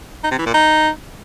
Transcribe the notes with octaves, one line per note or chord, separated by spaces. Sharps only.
D#4
C3
E3
A#2
D#4